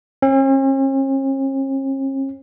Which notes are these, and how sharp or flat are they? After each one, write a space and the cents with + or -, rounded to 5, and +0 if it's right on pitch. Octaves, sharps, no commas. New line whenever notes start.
C#4 -45